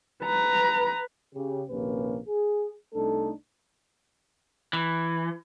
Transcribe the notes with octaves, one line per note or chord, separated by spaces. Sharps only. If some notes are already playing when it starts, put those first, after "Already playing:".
B4 A#5
C#3 G4
A#1 D#2 C3 A#3 C#4 B4
G#4
C2 A3 D4 D#4 A4
E3